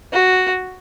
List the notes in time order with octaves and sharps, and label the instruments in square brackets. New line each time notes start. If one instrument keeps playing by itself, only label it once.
[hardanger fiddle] F#4